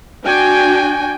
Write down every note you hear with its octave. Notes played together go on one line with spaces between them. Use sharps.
D4 F#4 G5 G#5